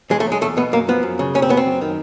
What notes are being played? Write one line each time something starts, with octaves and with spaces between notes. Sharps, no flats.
E2 G#3
A3
F#3
G#3
E2 A3
B2 B3
F#2 A#3
F3 B3
F#2
C#3
F#2 C#4
C4
F#3 B3
C4
F#2
D#3